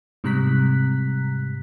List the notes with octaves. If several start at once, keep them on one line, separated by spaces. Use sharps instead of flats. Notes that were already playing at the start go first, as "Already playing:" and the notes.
G#2 C3 G3 A#5 F#6 B6